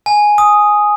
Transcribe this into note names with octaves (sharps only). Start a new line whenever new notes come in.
G#5
D#6